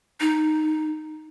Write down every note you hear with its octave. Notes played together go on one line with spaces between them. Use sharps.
D#4